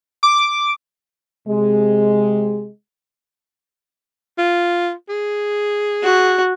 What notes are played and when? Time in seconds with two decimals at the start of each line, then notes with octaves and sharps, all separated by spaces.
0.23 D6
1.48 C3 G#3
4.38 F4
5.09 G#4
6.03 F#4